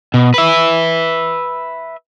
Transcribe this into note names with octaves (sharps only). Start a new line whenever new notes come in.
B2
B4 E5